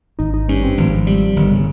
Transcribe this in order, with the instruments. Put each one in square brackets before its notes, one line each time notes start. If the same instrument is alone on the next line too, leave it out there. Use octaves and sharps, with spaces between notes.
[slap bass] G#1 [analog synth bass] D#4
[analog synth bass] D#4
[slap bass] G2 [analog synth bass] C#4
[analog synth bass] C4
[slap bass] G#1 [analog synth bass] F3
[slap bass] G3
[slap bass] G1 [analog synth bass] D#3
[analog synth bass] C#3